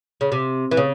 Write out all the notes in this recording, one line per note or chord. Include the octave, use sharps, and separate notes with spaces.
C#3
C3
E3
C#3